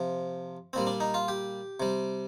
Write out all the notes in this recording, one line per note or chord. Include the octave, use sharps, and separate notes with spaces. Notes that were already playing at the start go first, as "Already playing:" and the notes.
Already playing: C3 F3
A#2 G3 C4
D4
D#4
F4
G4
C3 G3